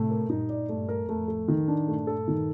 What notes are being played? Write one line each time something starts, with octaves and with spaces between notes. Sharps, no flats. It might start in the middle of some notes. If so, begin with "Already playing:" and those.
Already playing: A2 C3 A3
A#4
G2 A#2 D#4
D5
G2 A3
A#4
F2 A2 A3
A4
D#3
D4
G2 A#2 A3
A4
D#3